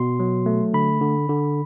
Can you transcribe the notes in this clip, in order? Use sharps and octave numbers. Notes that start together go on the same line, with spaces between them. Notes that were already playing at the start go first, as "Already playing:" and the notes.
Already playing: B2 C6
F#3
A3
D3 B5
D3
D3